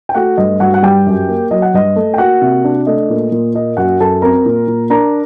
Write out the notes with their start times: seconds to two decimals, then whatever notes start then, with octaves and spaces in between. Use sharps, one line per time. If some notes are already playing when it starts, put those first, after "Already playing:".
0.09 G5
0.15 A3 F#4 F#5
0.37 G2 D#5
0.60 G2 F#4 F#5
0.74 F#5
0.82 G3 G4 G5
1.06 F#2
1.28 A#3
1.51 F#3 D#5
1.62 F#5
1.74 G2 D#5
1.96 A3
2.14 G5
2.18 A#3 F#4 F#5
2.42 C3
2.64 D4
2.87 A3 D#5
3.10 A#2
3.32 A#2
3.54 A#3 D#5
3.77 F#2 F#4 F#5
4.00 F#2 A4 A5
4.22 C4 A#4 A#5
4.46 A#2
4.68 A#2
4.90 D4 A#4 A#5